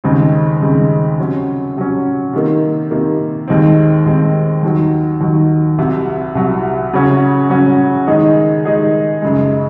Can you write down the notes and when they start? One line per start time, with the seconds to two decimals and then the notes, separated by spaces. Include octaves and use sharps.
0.04 D#2 C#3 G#3 C4
0.62 D#2 C#3 G#3 C4
1.18 C3 F#3 C#4
1.76 C3 F#3 C#4
2.33 C3 D#3 A#3
2.91 C3 D#3 A#3
3.48 D#2 D#3 G#3 C4
4.06 D#2 D#3 G#3 C4
4.63 D#2 D#3 F#3
5.21 D#2 D#3 F#3
5.78 C2 C3 F#3
6.35 C2 C3 F#3
6.93 C#3 F#3 C#4 F#4
7.50 C#3 F#3 C#4 F#4
8.07 D#3 G#3 D#4 G#4
8.65 D#3 G#3 D#4 G#4
9.22 F#2 C#3 G#3